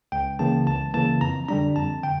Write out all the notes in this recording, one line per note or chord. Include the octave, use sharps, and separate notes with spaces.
C#2 G5
C#3 E3 A#3 A5
C#2 A5
C#3 E3 A#3 A5
F2 A#5
D3 G3 D4 A#5
F2 A5
D3 G5